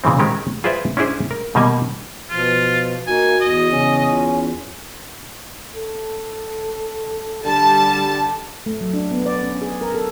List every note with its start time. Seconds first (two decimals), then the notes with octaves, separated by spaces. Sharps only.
0.04 A#2 C#3 E3 C4
0.19 D#3 G#3 C4 C#4 G4
0.64 F4 G#4 B4 C5 D5 E5
0.97 C#4 D4 E4 G#4 C5
1.31 A#4
1.55 B2 D#3 G3 A#3 D#5 G#5
2.30 B2 F3 F4
3.07 A#3 D#4 F#4 G#5
3.41 E2 D#5
3.73 C#3 C#4
4.11 F4
5.76 A4
7.45 D3 G3 A5
8.66 A3
8.81 F#3
8.94 D4
9.11 B3
9.26 D5
9.44 C#4
9.61 G#4
9.81 A#4
9.95 A4